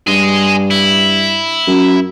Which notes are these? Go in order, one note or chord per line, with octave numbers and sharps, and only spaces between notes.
G2 G#4 D#5
E4
F#2